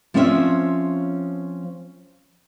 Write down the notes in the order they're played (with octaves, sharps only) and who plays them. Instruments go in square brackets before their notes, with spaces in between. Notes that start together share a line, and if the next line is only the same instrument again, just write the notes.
[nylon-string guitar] F3 C4 C#4 C#5 E5